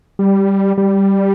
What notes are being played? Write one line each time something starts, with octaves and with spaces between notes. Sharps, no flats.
G3
G3